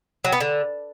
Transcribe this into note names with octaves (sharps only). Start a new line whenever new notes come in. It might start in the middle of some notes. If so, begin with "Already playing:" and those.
F#3
B3
D3